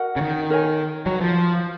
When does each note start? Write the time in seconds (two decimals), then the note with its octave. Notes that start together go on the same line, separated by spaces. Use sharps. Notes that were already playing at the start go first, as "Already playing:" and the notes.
Already playing: F#4 A#4 D#5 F#5
0.16 C#3
0.21 D#3
0.50 D#4 A#4 C#5 G#5
1.06 F#3 B4 D#5 A#5
1.21 F3